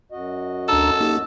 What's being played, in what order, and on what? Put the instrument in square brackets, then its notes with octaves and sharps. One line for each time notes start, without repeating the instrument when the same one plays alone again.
[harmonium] F#2 F#4 D#5
[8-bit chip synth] D2 D4 A#5 [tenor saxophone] A4 [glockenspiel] E6
[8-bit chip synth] A#3 D#4 G4